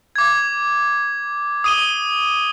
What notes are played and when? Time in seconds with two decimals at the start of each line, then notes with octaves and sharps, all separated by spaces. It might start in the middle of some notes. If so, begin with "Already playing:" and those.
0.16 D6 G#6
1.64 D#6 D#7 G7